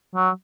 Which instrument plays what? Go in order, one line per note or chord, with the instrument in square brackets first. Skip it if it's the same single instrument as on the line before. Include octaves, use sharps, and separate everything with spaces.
[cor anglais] F#3